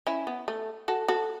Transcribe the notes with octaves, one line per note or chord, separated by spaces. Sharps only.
C#4 E4
B3
A3
F#4 A4
F#4 A4